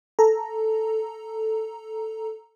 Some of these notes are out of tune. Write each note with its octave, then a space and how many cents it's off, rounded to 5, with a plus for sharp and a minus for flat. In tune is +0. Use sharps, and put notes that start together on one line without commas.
A4 +0 A#5 +0